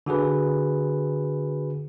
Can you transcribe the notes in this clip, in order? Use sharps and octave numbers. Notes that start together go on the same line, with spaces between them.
D3 F#4 G#4 B4